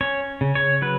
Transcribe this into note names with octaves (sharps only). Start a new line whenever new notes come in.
C#4 C#5
C#3
C#5
F#3 B4